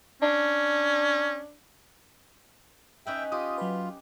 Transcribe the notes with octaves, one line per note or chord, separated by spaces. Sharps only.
C#4 D4
C#4 D#4 B4 E5 G5
F4 G4 D#6
F#3 B4